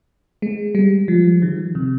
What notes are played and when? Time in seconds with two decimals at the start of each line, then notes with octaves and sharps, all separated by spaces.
0.42 G#3
0.75 G3
1.08 F3
1.42 D#3
1.75 C3